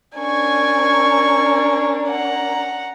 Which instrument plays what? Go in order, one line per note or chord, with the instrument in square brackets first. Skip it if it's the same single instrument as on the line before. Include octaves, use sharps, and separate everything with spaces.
[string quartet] C#4 D4 A#4 [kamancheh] G#5 C#6
[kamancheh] F#5 A#5